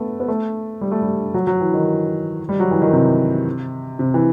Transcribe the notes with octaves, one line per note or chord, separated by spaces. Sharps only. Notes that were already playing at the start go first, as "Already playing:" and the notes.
Already playing: A3 B3
B3
A3
G3
A3
G3
F#3
F#3
E3
D#3
G3
F#3
E3
D#3
C3
C3
E3